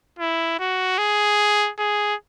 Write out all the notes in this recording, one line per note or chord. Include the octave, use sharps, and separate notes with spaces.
E4
F#4
G#4
G#4